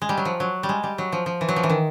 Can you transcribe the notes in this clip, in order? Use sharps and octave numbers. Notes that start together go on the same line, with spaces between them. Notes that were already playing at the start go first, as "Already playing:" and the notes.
G#3
G3
F#3
F3
F#3
G3
G#3
G3
F#3
F3
F3
E3
F#3
F3
E3
D#3